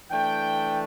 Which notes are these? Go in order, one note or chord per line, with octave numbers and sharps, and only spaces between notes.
E3 A3 D4 G5